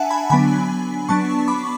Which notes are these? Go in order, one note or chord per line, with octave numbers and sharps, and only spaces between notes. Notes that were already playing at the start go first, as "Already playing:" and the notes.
Already playing: D4 E5 F#5 G#5 A5
G#5 B5
D3 F#3 B3 D4 G#5 B5
F#3 B3 D4 A5 C#6
B5 D6